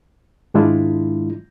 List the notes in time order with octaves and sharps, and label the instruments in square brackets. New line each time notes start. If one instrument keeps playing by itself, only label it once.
[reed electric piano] G#2 D#3 G#3 D4 E4 F4